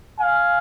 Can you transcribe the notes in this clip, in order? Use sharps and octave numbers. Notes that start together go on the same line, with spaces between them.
F5 G#5